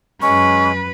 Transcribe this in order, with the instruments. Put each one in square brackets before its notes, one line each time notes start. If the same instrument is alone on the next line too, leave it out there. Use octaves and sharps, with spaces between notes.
[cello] F#2 B4 [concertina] G#3 C#4 [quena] C#6